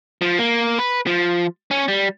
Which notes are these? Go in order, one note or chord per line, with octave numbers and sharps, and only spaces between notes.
F3
A#3
B4
F3
C#4
G3